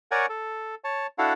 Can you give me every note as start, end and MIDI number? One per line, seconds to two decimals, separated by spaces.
0.11 0.26 70
0.11 0.26 73
0.11 0.26 74
0.11 0.26 78
0.11 0.26 80
0.11 0.26 85
0.29 0.75 69
0.84 1.07 73
0.84 1.07 81
1.18 1.33 62
1.18 1.33 64
1.18 1.33 66
1.18 1.33 69
1.18 1.33 77
1.18 1.33 78